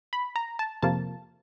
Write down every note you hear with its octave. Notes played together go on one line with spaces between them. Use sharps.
B5
A#5
A5
F2 C3 F3 A#3 A5